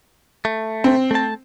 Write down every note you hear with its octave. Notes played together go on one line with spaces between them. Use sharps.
A3
C4
A3 A5